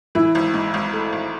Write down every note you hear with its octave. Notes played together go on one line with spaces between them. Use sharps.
E3 E4
G#1
G#2
G#1
A3
G#1